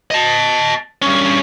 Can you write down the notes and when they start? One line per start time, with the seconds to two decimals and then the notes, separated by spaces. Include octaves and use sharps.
0.11 D#5 A5
1.02 G2 C#4